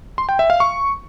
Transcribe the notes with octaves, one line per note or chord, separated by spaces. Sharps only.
C6
G5
E5
F5
C#6